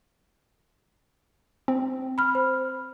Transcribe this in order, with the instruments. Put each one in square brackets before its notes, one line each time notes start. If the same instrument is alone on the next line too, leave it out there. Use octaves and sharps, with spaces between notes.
[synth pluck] C4
[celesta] B5 F6
C5